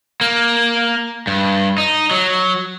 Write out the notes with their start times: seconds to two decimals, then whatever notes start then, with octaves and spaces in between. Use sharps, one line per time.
0.21 A#3
1.27 G2
1.78 D#4
2.11 F#3